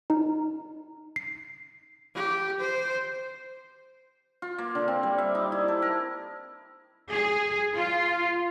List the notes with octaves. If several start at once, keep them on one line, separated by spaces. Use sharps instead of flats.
D#4
C7
G4
C5
F4
A#3
D3
C4
G3
E5
D#4
E4
A4
A#4
G#4
F4